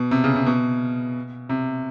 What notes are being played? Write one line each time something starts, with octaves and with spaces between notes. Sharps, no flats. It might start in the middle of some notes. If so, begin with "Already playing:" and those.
Already playing: B2
C3
C#3
C3
B2
C3